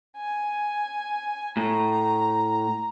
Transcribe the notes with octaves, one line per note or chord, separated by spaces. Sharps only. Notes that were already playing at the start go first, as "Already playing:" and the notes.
G#5
A2 A#5